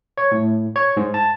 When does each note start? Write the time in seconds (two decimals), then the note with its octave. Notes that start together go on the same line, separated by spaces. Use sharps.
0.18 C#5
0.32 A2
0.76 C#5
0.97 G#2
1.14 A5